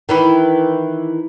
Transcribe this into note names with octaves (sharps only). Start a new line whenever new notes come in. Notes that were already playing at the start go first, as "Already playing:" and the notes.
D#3 E3 E4